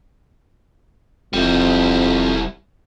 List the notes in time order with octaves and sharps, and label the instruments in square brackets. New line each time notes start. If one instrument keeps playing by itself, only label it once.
[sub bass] D#1 [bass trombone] F2 [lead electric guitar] G3 E4